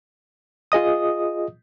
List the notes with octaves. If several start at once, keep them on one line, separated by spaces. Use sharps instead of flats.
F4 G#4 D#5 D#6